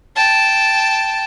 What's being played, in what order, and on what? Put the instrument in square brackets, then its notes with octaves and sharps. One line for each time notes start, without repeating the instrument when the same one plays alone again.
[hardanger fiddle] G5 A5